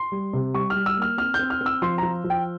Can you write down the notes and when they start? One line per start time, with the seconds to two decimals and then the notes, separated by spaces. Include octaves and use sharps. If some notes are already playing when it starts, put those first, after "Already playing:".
Already playing: C6
0.12 G3
0.33 C3
0.54 G3 C#6
0.70 F6
0.76 G3
0.86 E6
0.97 A#3 F6
1.18 C4 F6
1.34 G6
1.39 C4
1.50 F6
1.61 C4
1.66 E6
1.82 F3 C6
1.98 F3 A#5
2.24 F3
2.30 G5